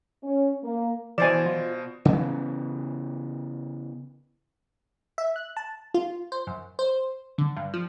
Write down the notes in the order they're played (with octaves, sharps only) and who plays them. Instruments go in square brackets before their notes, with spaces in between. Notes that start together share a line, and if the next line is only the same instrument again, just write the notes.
[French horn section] C#4
A#3
[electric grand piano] B2 C5 E7 [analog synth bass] E3 [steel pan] D5 G#5
[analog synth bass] F4
[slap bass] C#3 E3 B3
[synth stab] E5
F#6
A5
F4
C5
F#2
C5
D3
G2
F3